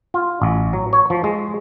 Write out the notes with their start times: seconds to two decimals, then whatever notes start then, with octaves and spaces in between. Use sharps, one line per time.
0.14 F4
0.42 A1
0.73 F#3
0.93 C#5
1.10 F3
1.24 G#3